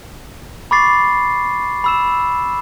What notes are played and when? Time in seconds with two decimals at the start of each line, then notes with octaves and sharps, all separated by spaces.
0.71 B5 C#6 D6 A6 C7
1.84 B5 E6 E7